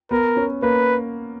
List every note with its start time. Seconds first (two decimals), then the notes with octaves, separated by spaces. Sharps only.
0.11 B3 A#4
0.37 C#4
0.62 A#3 B4